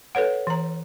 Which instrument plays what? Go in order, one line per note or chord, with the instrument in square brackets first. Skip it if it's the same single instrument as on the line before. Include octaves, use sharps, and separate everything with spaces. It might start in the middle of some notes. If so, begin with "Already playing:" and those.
[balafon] A4 B4 C#5 F#5
E3 A#5